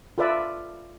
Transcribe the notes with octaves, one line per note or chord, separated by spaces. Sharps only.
F4 A4 B4 D5 E5